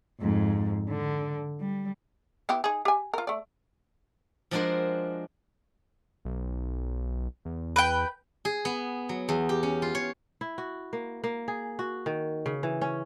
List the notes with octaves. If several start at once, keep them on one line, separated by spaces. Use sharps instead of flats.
F2 G#2
D3
G3
B3 E4 G4
D#4 G#4
G4 G#5
F4 A#4
A3 D5
F3 G#3 D4 F#4 A#4 C5
B1
E2
B4 G5
G#4
B3
F#3
E2
G4
C#4
F4
C#5
E4
F#4
A#3
A#3
G#4
F#4
D#3
C#3
E3
C#4